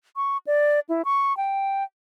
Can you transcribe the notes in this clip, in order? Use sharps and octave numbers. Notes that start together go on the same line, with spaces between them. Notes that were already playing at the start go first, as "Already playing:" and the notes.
C#6
D5
E4
C#6
G5